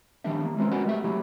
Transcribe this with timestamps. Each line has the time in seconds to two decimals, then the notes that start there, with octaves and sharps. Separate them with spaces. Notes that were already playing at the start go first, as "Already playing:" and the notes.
0.24 D#3 F3 G3 A#3 D4 E5
0.45 A#3
0.57 G#3 A#3 C4 C#4 F4 B4
0.72 C#4 F#4 A#4 B4 D#5 F#5
0.86 G3 A3 E5
1.04 F#3 A3 E4 G4 G#4